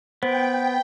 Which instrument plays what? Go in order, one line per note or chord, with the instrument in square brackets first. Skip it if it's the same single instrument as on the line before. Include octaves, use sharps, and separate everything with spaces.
[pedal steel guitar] B3 [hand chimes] C5 [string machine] G5